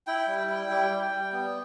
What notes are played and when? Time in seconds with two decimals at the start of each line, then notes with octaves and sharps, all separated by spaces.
0.07 E4 G5
0.28 G3
0.49 E4
0.70 G3
0.91 G3
1.11 G3
1.33 B3